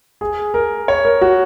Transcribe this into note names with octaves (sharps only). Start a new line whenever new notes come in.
G#4
A#4
C#5
A#4
F#4